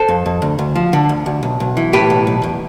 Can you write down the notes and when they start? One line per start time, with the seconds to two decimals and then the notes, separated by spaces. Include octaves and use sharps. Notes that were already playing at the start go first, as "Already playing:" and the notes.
Already playing: A4 C5
0.08 F2
0.26 F2
0.42 D2
0.59 D2
0.76 F3
0.93 D3
1.09 D2
1.26 D2
1.43 B1
1.60 B1
1.77 E3
1.93 A2 G4 B4
2.10 B1
2.27 B1
2.44 E2